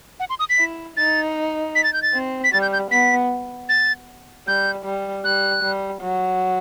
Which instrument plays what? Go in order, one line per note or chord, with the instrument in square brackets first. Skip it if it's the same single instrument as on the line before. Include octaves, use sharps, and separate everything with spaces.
[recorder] F#5
C6
D#6
B6
[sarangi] E4
[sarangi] D#4 [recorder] A6
[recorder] B6
A6
G6
A6
[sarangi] C4
[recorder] B6
[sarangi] G3 [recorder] A6
[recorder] G6
G6
[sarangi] B3 [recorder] B6
[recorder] A6
[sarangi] G3 [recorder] G6
[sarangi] G3
[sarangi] G3 [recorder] F#6
[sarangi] G3
F#3